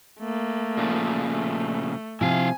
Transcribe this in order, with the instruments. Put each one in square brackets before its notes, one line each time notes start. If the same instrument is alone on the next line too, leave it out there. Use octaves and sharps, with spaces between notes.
[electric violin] A3 A#3
[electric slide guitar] A#2 C#3 F3
[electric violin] A3
[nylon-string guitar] C3 F3 [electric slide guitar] E4 F5 [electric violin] G#5